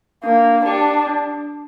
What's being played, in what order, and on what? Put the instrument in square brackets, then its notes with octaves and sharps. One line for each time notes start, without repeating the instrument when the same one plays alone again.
[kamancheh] A#3 [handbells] D4
[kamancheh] D4 [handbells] G4 D5 G5
[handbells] D4